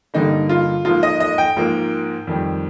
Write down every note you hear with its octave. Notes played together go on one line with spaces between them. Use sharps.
G2 D3 G3 A#3 D#4
F4
G#2 F3 A#3 F4
D#5
D#5
G5
G#2 F3 A#3
F2 D#3 G3